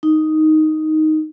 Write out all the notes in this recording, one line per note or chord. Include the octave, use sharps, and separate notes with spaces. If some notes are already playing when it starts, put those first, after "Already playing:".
D#4